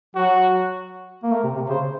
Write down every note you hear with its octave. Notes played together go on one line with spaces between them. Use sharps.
F#3 F#4
A#3
A3 A#4
C3
C3
C#3 C5